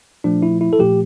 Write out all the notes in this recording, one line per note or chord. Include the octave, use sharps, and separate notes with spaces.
A#2 F3 A3 D4
E4
E4
A4
A#2 F3 A3 G4